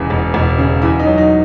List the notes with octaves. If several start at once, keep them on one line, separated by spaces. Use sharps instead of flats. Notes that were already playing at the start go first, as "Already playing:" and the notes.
Already playing: E1 E2 C#3 G#4
E1
E1
C#3
E2 E4
D#4
F#3
D#4